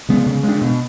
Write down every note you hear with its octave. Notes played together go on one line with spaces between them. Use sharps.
C#3 G#3 B3
C#3
G#3
D4
B2